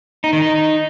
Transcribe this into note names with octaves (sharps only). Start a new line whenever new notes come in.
D#4
D#3
D#4